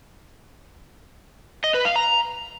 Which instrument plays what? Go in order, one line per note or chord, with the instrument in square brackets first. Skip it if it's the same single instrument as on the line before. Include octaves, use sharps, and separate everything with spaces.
[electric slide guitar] D#5
B4
F5
A#5